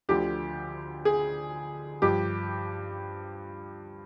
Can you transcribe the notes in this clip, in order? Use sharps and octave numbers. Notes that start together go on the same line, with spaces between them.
D2 D3 F3 G4
G#4
G2 F3 G4